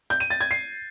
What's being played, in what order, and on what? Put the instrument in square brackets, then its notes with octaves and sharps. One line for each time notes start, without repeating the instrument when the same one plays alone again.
[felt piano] G6
D#7
A6
G#6
C7